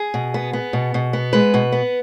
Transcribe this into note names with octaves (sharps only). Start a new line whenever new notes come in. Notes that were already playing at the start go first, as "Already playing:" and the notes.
Already playing: G#4
B2
B3
B3
B2
B2
B3
G#3 B4
B2
B3